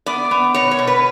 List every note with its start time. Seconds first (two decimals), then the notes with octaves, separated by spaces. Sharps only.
0.06 B3 D5
0.31 B3
0.54 B2 C#5
0.71 C#5
0.79 B2
0.87 B4